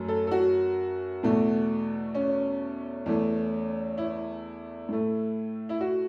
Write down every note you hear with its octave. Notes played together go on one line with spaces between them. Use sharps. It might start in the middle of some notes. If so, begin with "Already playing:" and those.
Already playing: F#2 F#3 A3
A4
A4
F#4
E2 B2 A3
C#4
E2 E3 A3
E4
A2 A3
E4
F#4